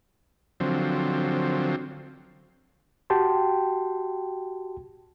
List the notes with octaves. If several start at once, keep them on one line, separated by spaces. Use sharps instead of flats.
D3 F3 F#3 C4
F#4 G4 G5 A5 C6